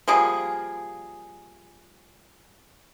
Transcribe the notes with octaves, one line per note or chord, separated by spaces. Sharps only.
F3 G3 A#3 G#4